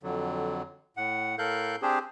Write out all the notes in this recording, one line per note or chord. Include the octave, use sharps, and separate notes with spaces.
F2 D3 F#3
A2 F#5
A2 A4 A#4 F5 F#6 G6
C4 D4 G4 G#4 C5